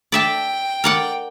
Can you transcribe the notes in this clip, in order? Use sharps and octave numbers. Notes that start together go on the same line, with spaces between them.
D5 E5 G5 A5
A#4 D5 F#5